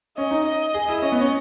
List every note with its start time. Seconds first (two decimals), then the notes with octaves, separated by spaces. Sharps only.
0.17 C#4 D#5
0.31 D#4
0.45 D#5
0.74 G#4
0.88 E4
1.02 C#4 D#5
1.12 B3
1.21 C#4